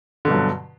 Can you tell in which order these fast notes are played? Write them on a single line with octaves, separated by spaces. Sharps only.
D3 B2 G2 F#3